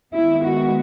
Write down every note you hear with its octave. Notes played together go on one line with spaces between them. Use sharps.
D#3 G#3 B3 E4
F#4